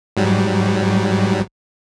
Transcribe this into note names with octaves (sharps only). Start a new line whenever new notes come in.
G#2 F#3 G3